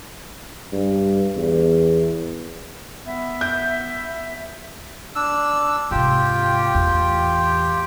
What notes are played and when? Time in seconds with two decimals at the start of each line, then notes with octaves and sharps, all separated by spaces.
0.73 G2
1.37 E2
3.06 B3 E5
3.41 G6
5.16 D4 E6
5.91 G#2 C3 F4 G4 G5
6.75 E2 A2